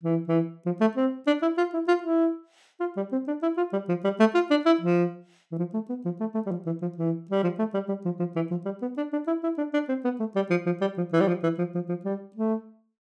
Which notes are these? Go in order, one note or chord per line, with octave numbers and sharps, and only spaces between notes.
E3
E3
F3
A3
C4
D4
E4
F4
E4
F4
E4
F4
G3
C4
D4
E4
F4
G3
F3
G3
A3
F4
D4
E4
F3
E3
F3
A3
B3
F3
A3
A3
G3
F3
E3
F3
E3
G3
F3
A3
G3
G3
F3
F3
E3
F3
G3
B3
D4
D4
E4
E4
D4
D4
C4
B3
A3
G3
F3
F3
G3
F3
E3
G3
F3
E3
F3
F3
F3
G3
A3